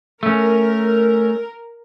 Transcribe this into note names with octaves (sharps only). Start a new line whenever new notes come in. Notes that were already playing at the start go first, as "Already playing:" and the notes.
A3 C#4 A#4